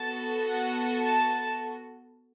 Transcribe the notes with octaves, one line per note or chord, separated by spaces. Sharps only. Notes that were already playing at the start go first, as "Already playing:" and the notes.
Already playing: B3 F#4 A4 A5
F#5
A5